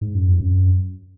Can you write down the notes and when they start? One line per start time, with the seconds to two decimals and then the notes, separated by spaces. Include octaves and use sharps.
0.01 G#2
0.15 F#2
0.28 F2
0.41 F#2